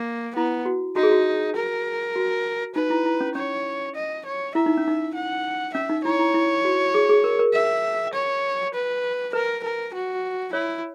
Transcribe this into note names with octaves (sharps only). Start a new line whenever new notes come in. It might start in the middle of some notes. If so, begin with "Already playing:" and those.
Already playing: A#3
B3 E4
F#4
D#4 F#4
G#4
F#4
A#4
F#4
D#4 B4
E4
E4
C#4
C#4 C#5
D#5
C#5
E4 E5
D#4
C#4
D#4
F#5
C#4 E5
D#4
E4 C#5
E4
E4
F#4
G#4
G#4
A#4
A#4
E5
C#5
B4
A#4 B4
A#4
F#4
E4 C#5